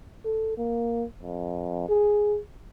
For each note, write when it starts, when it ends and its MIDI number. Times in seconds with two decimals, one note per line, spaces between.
0.25 0.54 69
0.57 1.04 58
1.23 1.88 41
1.89 2.38 68